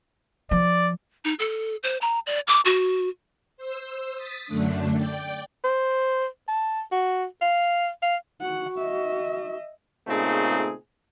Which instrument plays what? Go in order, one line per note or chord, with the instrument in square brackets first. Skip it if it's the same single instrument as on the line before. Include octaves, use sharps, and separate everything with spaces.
[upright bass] F3 [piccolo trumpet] D5
[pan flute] D#4
A4
C5
A#5
D5
D6
F#4
[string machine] C5 E6
D#6 A6 B6
F#2 D3 A3 D4
D5 G5
[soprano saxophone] C5
A5
F#4
F5
F5
[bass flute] F#4 [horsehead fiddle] F#5
[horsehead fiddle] D#5 E5
[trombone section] A#2 C#3 A3 C4 D#4 G#4